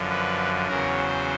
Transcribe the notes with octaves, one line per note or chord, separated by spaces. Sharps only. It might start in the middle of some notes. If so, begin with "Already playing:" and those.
Already playing: F#2 D3 F3
B4
E2 C#3 F#3 A#4
C5